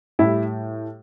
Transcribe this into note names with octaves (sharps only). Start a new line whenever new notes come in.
A2 G3 E4